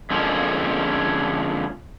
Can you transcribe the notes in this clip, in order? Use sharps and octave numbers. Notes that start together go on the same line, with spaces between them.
F2 D3 F3 G#3 A#3 C#4